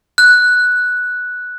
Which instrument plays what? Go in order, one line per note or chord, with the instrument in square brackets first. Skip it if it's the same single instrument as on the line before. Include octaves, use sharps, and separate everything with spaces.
[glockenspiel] F#6